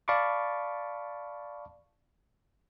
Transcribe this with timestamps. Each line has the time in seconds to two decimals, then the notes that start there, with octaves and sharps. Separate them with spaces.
0.08 D5 F5 A5 B5 C#6 D6